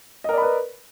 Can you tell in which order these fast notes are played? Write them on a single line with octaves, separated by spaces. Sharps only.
D#5 A#4 D5 B5 B4